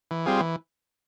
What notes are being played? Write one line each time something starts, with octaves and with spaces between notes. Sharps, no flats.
E3
G3 C4 F4 G#4
E3